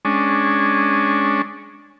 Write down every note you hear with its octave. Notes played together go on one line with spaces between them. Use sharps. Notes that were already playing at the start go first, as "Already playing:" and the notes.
G#3 C#4 D4